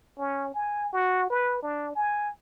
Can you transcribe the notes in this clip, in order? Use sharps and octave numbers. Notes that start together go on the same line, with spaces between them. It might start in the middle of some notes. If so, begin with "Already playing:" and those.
C#4
G#5
F#4
B4
D4
G#5